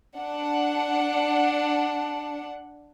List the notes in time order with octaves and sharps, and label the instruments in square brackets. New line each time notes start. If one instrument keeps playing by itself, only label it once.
[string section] D4 F#5